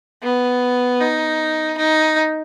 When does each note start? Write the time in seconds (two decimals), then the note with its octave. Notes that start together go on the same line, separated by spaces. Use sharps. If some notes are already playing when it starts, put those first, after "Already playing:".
0.23 B3
1.01 D#4
1.78 D#4